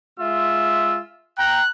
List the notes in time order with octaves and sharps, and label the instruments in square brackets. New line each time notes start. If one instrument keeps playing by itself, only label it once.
[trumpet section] G#3 F4 E5 [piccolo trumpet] E6
[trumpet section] G5 A#5 [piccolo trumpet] F#6